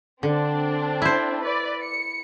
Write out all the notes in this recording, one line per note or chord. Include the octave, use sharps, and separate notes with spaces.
D3 C4 D4
E4 C5
B4 D5
C#7